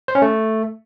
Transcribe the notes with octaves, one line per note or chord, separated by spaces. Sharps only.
C5
C#4
A3